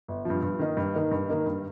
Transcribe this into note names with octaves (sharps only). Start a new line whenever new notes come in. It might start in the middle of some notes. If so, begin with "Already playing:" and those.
G1
G2 F3
G2
D#3 A#3 D#4
G2
D#3 A#3 D#4
G2
D#3 A#3 D#4
G2